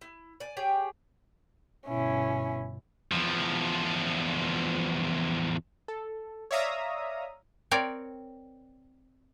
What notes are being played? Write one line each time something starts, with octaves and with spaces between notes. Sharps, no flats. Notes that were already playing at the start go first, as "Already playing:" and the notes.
E4
D5 G#5
G4 G#4 C#5 G5
G1 B2 C#4 E4
E2 F3
A4
C#5 D5 E5 F5 A#5 D#6
C4 A#4 C#5 D5